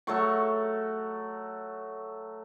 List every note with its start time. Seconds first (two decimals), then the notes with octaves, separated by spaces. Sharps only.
0.07 F#3 A3 C#6